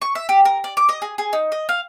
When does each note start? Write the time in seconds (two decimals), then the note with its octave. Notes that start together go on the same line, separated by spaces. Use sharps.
0.02 C#6
0.15 E5
0.29 G4
0.45 A#4
0.64 D5
0.77 D6
0.89 D#5
1.02 G#4
1.18 G#4
1.33 D#4
1.52 D#5
1.69 F5